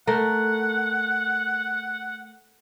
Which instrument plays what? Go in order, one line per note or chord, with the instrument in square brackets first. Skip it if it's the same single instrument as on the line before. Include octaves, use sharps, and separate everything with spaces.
[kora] A3 A#4 [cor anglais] F#5